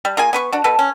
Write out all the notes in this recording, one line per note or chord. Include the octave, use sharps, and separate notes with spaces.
G3
A#3 F4 G#4 G#5
B3 B4 C#6
D4 F#4
B2 A4 B4
C#4